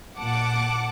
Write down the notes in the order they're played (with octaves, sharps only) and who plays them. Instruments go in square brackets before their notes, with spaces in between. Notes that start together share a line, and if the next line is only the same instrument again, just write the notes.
[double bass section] A#2 [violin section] F#5 A5 D6